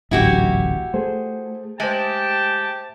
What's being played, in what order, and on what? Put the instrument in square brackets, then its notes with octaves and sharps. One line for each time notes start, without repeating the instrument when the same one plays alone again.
[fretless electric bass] D1 A1 F#3 [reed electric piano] G#2 [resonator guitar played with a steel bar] E4 F#4 G4
[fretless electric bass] A3 [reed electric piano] G#4 C5
[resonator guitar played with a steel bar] G#3 [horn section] G4 G5 A5 [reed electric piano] C5 E5